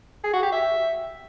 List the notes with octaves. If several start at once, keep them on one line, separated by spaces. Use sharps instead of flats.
G#4
F#4
G4
E5